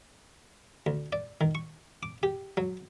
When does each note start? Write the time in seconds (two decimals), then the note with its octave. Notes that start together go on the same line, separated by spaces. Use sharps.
0.86 D2
1.13 D5
1.41 D#3
1.55 C#6
2.03 D6
2.23 G4
2.57 F#3